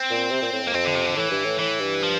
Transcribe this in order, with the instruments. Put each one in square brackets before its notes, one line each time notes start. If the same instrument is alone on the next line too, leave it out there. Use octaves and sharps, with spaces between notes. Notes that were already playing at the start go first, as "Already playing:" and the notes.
Already playing: [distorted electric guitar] C4
[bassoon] A#2
C3
A#2
A2
F2
[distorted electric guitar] A#3
[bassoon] F2 [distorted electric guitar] C4
[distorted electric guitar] D3
C3
D3
[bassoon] A2 [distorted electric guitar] E3
[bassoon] G2
A2
[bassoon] A2 [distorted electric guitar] E3
[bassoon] G2
[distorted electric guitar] F3